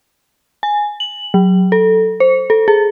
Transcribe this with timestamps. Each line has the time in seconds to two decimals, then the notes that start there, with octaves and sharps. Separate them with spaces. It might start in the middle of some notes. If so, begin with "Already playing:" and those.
0.63 G#5
1.00 F#7
1.34 F#3
1.72 A4
2.20 C5
2.50 A4
2.68 G#4